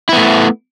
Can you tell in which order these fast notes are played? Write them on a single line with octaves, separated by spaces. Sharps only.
E4 B3 A3